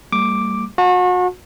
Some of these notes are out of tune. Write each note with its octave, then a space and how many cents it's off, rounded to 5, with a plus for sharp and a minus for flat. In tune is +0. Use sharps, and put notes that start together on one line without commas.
G3 +0 A#3 -45 D6 +0
F#4 -35 A5 +0